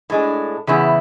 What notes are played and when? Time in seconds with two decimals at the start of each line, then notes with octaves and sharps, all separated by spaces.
0.10 A2 G#3 D4
0.67 E2 C#3 B3 E4